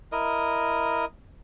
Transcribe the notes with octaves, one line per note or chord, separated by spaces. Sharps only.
E4 A#4 D#5